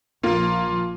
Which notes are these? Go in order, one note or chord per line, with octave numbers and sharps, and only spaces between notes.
A#1 F3 A#3 F4